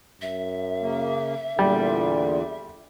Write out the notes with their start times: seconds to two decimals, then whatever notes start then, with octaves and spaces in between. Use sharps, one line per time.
0.22 F#2 E5
0.82 C#3 A#3
1.59 E2 A#2 D3 G3